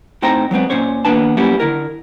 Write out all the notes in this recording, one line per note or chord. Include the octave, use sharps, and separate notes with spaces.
A2 C4 D#4 C5 G5 A#5
F#3 G#3 B3 C4
A#2 C#4 C5 C#5
D#2 A#3 B3 D4 B4 A5
F#3 G3 A#3 B3 C#4 E4
D3 E4 A#4